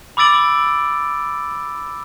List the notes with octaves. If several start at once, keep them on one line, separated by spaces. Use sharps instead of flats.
B5 D6 E6 A6 D7 F#7